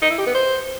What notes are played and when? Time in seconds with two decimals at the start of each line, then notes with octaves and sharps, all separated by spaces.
0.02 D#4
0.10 E4
0.18 G4
0.27 B3
0.35 C5